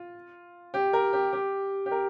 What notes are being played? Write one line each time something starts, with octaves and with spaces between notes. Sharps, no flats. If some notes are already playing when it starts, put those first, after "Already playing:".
Already playing: F4
G4
A#4
G4
G4
G4
A#4